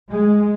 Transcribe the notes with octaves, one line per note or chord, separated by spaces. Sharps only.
G#3